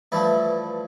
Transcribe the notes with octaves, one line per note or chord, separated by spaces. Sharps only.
G2 E3 F3 A3 E4